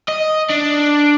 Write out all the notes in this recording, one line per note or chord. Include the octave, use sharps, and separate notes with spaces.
D#5
D4